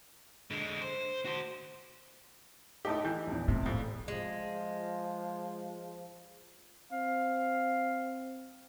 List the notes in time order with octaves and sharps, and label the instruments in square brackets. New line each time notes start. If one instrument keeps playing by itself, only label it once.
[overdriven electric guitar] D3 G#3
C5
F#4 C5
[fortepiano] A2 A3 G4 [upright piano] D#4 D#5
[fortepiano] E3 [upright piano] G6
[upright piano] A#1 E2
[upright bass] A2 [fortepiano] C3
[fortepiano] F2
[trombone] F3 [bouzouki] G#3
[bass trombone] C4 [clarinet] F5